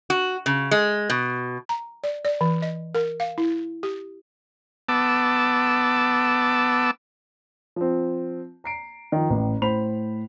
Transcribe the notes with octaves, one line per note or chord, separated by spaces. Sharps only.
F#4
C#3
G#3
B2
A#5
D5
D5
E3
D#5
A#4
F5
E4
G4
B3 A5 D6 E6
F3 C4
A#5 C7 D7
D#3 F3
A1 A2
A2 C5 B5 F7